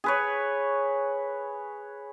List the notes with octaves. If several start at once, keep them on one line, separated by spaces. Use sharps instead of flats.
G#4 B4 C#5